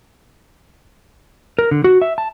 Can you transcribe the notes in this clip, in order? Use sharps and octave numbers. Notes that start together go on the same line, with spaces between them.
A#4
D3
F#4
E5
A5